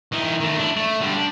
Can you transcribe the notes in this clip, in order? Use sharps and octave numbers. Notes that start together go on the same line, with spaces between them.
E3 D#4
D#3 A3
D4 E4
A3
D3 G3
D4